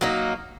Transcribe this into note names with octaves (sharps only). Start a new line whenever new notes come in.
F#3 A#3 D#4